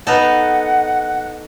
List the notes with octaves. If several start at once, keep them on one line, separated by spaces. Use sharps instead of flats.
B3 D#4 A4 F#5